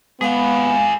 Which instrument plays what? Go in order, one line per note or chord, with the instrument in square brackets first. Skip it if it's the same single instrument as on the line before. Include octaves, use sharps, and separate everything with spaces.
[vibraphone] G#3 F5 G#5 [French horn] B3 [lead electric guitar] G#4 B4